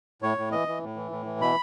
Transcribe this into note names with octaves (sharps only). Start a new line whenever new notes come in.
A2 C#5
A2
E3 D#5
E3
A2
E3
A2
E3
B2 B5